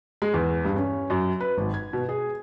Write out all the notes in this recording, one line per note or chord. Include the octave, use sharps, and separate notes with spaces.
G#3
E2
G2
C#4
F#2
B4
G#1
G#6
B2
G#4